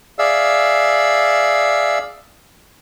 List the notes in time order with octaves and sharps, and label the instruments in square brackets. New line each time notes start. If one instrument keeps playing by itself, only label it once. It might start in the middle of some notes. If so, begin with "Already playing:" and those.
[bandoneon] G#4 D5 E5 F5 E6